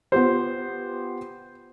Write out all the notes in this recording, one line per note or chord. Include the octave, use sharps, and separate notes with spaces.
B3 F4 G4 C5